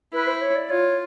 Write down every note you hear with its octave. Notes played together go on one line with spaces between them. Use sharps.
E4 B4
C5
C#5
D5
F4 C#5